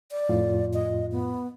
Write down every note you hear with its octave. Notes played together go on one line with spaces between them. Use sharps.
D5
F2 A2 F4
D#5
B3